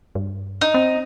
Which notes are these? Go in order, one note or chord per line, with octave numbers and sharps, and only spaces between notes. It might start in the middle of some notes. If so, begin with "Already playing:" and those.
G2
D#4
C4